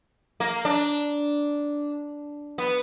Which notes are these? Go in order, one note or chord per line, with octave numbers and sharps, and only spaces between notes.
A#3
D4
B3